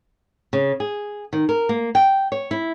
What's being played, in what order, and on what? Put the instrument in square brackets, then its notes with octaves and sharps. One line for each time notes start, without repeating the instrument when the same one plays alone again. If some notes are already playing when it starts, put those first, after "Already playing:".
[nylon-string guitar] C#3
G#4
D#3
A#4
A#3
G5
C#5
E4